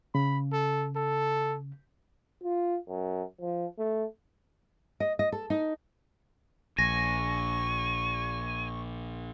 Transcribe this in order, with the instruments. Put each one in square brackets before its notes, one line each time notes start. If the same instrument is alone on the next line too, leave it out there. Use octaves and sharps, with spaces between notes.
[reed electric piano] C#3 [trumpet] B5
[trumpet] A4
A4
[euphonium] F4
F#2
F3
A3
[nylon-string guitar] D#5
D#5
A4
D#4
[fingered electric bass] A#1 [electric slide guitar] G#5 [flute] C#6 [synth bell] A#6